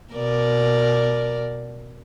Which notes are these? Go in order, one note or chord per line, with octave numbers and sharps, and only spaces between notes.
B2 A#4 D5